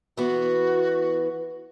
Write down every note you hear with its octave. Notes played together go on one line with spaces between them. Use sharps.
E3 B3 F#4